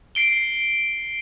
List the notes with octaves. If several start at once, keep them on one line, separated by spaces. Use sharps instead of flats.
C7 D7 G7